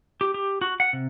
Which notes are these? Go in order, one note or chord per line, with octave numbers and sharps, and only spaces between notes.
G4
G4
F#4
F#5
C3